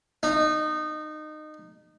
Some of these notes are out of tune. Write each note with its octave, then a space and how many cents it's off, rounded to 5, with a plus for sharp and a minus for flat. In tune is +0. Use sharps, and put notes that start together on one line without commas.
D#4 -25